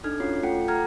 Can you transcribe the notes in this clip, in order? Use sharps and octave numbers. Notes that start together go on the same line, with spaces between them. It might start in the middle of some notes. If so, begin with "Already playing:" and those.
D4 D#4 A4 F6 G#6
C#4 F4 F#4 C#5 C7
A3 F4 A4 F#5 G5 C#7
A4 F#5 G5 A#5 F6 G#6